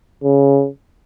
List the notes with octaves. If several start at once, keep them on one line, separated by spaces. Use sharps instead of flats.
C#3